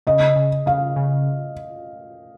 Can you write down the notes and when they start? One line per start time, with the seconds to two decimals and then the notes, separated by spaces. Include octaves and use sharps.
0.07 C#3 D#5
0.36 C#3
0.66 C#3 F5
0.96 C#3